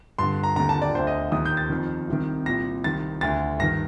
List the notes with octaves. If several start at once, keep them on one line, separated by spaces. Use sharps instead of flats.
G2 D3 C6
A#5
D#2 D3 A#5
A5
D5
D2 D3 C5
D#5
D#2 D#3 D#6
G6
A6
F2 D#3
C2 C3 D#3
C2 A#2 A#6
C2 C3 D#3 A6
D2 D3 A6
G2 D#3 A#6